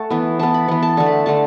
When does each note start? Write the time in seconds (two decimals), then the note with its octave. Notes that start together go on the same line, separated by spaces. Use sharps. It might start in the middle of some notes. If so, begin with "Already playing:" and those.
Already playing: A3 F#5 A5
0.10 E3 B3
0.39 E3 B3 A5
0.54 B5
0.68 E3 B3
0.83 A5
0.97 D3 A3 A5
1.06 B5
1.26 D3 A3 A5